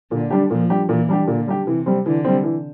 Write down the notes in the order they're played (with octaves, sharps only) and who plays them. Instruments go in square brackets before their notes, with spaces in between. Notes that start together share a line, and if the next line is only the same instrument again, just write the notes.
[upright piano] A#2 [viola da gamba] D3
[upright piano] G3 D4 G4
[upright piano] A#2 [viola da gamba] F3
[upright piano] G3 D4 G4
[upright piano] A#2 [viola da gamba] E3
[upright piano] G3 D4 G4
[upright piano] A#2 [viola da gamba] D3
[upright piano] G3 D4 G4
[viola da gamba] C3 [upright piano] E3
[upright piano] G3 C4
[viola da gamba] D3 [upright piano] E3
[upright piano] G3 C4
E3